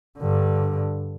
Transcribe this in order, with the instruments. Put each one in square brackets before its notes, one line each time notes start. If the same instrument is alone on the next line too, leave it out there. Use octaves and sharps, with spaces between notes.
[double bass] G2 D3